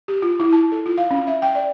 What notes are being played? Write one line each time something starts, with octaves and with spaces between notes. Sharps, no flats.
G4
F4
E4
A5
A4
F4
F5
C#4
E5
G5
D5